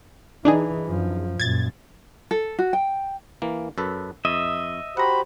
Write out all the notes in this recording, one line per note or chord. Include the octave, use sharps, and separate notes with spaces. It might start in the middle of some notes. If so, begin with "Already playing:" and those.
E3 D4 D#4 G#4
F#2 F3
F#2 A#2 G#6 A6
A4
F#4
G5
E3 A#3
F#2 A4 B4
F2 D#5 E5
F#4 G4 C5 F#5 A#5 B5